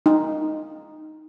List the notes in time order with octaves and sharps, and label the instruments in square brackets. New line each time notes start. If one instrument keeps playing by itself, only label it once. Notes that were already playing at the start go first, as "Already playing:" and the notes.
[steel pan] D#4